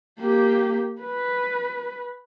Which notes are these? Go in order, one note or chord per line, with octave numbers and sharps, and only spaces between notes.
A#3 G4
B4